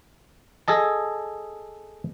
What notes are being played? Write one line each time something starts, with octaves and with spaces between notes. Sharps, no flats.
G#4 A4 D#5 A5